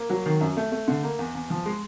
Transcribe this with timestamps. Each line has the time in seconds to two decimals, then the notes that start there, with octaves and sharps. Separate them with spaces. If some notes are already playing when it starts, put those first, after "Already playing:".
Already playing: A#3
0.10 F#3
0.26 D#3
0.41 F#2
0.57 A3
0.72 A3
0.88 D3
1.03 A#3
1.19 E2
1.35 E2
1.50 F3
1.66 G#3